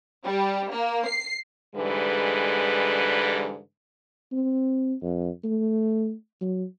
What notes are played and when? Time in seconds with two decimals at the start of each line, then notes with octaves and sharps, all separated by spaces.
0.24 G3
0.72 A#3
1.07 C7
1.76 G#2 D3 E3 G3 G#3 B4
4.33 C4
5.03 F2
5.44 A3
6.41 F#3